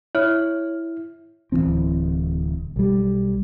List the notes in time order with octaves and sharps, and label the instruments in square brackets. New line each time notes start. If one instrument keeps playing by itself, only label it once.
[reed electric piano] E4 [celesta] C#5 F6
[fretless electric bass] D1 F2 E3 C4
B1 G3